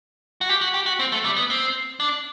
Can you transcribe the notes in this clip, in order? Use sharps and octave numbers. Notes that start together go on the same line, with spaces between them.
F#4
G4
F#4
G4
F#4
C4
A3
G3
B3
C4
D4